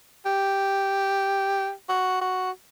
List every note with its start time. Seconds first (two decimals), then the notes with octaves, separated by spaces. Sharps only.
0.25 G4
1.89 F#4
2.21 F#4